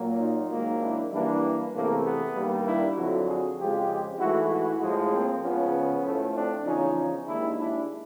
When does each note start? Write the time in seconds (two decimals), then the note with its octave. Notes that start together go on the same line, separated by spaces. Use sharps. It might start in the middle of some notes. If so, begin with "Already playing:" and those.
Already playing: A#2 F#3 A#3
0.19 D#4 F4
0.50 G#2 D#3 F#3 A#3
0.81 D4 E4
1.11 G2 E3 G3 A#3 D4 E4
1.73 E2 C3 E3 A3 A#3
2.04 B3
2.34 G2 D#3 G3 A#3
2.65 D4 E4
2.96 F2 D3 F#3 E4 F#4
3.27 F#4 G#4
3.58 F2 C#3 F3 G#3 F4 G4
4.19 G#2 E3 A3 E4 F#4
4.50 E4 F#4
4.81 A2 F3 G#3
5.11 A#3 C4
5.42 C#2 C#3 F3 B3 C#4
6.04 A2 F3 A3
6.35 C4 D4
6.65 E2 C#3 F3 C#4 D#4
7.26 D#2 D#3 G#3 D4 E4
7.58 D4 E4